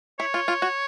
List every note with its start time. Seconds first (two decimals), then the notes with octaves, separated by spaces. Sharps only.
0.19 E4 C#5
0.34 F4
0.48 F4
0.62 F#4